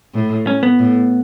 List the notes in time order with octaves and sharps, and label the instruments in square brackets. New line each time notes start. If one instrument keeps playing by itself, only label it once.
[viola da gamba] A2
[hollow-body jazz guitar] C#4
B3
[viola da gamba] A2